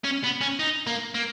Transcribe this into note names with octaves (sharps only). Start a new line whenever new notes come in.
C#4
B3
C#4
D#4
A#3
A#3